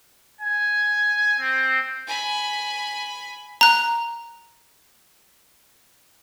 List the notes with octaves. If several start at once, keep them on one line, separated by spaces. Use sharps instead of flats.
G#5
C4
G#5 B5
A#5 F#6